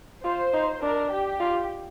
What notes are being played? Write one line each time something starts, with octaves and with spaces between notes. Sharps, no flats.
F4 C5
D#4
D4 A#4
G4
F4